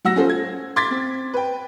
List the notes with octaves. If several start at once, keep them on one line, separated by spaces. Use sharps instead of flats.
F#3 F#5 E6 A#6
C#4 F4 A4 C5
G#6
C6 D6 G#6 A6 B6
C4
B4 G5